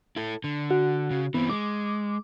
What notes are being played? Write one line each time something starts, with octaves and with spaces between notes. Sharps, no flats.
E4 A4
D3
F#4
C#3
E3 B3 C4
G#3 D6